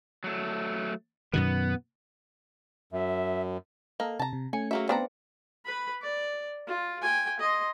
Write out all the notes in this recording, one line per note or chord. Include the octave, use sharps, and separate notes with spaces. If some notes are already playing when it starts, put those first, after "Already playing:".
F#3 A3
F#2 B2 D#3 B3
F#2 E5
A#3 A4 D#5
C3 A5 A#5
C3
A3 C#4 G#5 C#7
F#3 A#3 F#4 G#4 E5
B3 C4 D4 B4 C5 D5 F5 A#5
B4 B5
D5
F4
G5 G#5
D#5 C6